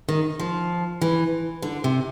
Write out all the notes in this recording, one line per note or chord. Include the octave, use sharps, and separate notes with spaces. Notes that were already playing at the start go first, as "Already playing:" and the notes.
D#3
F3
E3
D3
C3